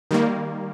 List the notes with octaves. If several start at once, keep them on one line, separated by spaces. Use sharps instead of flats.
D#3 G3 A#3